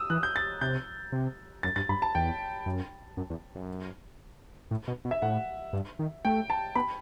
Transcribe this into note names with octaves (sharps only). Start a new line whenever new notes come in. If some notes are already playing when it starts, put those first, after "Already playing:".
Already playing: D#6 E6
E3 F#6
G6
A6
C3 G6
C3
F#2 A6
G2 A6
G2 B5
A5
E2 G5
F#2
F#2
E2
F#2
A2
B2
B2
E5
A2 F#5
G2
D#3
A3 G5
A5
B3 B5